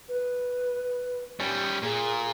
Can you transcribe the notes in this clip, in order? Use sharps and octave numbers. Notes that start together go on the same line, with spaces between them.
B4
G3 C#4
A#2 G#4